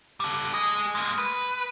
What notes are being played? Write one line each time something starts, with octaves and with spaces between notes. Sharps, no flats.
G3 A4
G#4 D#5
G#3 A#3
B4